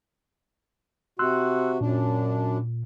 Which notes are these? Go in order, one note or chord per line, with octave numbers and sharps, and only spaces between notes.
C3 F#4 C6 E6 F#6
F#2 A#2 D4